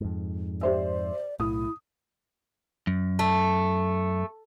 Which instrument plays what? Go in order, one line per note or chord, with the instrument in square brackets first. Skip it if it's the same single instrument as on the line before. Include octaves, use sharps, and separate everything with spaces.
[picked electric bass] F2 G#2
[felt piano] G4 C5 E5 [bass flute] D5
[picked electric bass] B1 A2 [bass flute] E4 [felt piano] D#6
[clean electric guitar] F#2
[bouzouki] A3